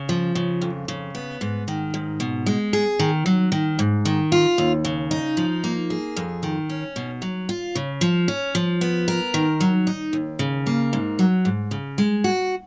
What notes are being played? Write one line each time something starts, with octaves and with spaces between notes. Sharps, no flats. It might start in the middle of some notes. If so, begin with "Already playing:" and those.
Already playing: C#3
F3
C#3
F2
C#3
B3
G#2
D#3
G#2
B2
G#3
G#4
D#3
F#3
D#3
G#2
D#3
F4
D#2
C#3
D#4
F3
A#3
G#4
F2
D#3
C#4
B2
F#3
F4
C#3
F3
C#4
F3
B3
A#4
D#3
F#3
D#4
D#2
C#3
A#3
G#2
F#3
G#2
C#3
G#3
F#4